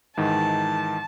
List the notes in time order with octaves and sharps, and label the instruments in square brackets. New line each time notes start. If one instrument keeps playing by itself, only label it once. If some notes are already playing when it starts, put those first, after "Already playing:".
[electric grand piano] G#2 D#3 E3 [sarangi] A5